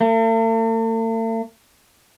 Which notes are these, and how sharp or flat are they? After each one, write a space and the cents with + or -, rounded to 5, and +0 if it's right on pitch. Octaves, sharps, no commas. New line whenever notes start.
A3 +45